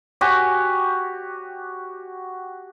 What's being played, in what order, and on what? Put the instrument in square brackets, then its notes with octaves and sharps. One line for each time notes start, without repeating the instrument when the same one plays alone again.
[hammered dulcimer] F#4 G4 G#5